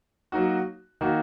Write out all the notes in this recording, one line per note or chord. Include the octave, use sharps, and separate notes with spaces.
F#3 A#3 D#4 F#4
D#3 A#3 D#4 F#4